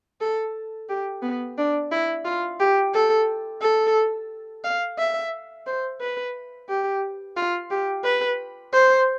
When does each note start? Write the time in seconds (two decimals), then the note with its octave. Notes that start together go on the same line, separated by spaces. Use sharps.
0.21 A4
0.89 G4
1.23 B3
1.58 D4
1.92 E4
2.25 F4
2.60 G4
2.94 A4
3.62 A4
4.64 F5
4.99 E5
5.67 C5
6.01 B4
6.69 G4
7.37 F4
7.71 G4
8.04 B4
8.73 C5